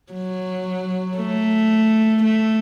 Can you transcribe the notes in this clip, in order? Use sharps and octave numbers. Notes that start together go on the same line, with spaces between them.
F#3
A3
A3